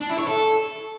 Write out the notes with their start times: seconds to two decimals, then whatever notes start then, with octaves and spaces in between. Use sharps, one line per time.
0.01 D4
0.09 E4
0.18 C#5
0.27 A4